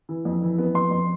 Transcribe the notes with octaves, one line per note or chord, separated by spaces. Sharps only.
E3
F2
E3
B3
F2 C6
F2